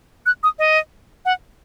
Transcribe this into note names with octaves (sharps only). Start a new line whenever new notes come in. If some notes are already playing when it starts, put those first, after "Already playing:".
F#6
D#6
D#5
F#5